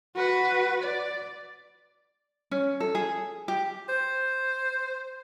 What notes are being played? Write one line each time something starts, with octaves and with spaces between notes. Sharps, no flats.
F#4 B4
D5
C#4
A4
G#4
G4
C5